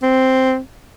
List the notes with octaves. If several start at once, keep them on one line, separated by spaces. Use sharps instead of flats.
C4